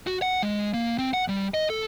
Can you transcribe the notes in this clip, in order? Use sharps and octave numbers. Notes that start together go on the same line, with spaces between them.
F#4
F#5
G#3
A#3
C4
F#5
G3
D#5
A4